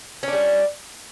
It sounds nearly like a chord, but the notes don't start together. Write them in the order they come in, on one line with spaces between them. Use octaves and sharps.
C#4 D4 G3